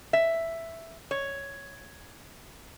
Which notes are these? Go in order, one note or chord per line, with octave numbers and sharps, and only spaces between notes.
E5
C#5